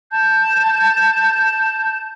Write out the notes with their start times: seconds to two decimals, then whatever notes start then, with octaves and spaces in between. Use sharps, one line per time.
0.12 A5 G6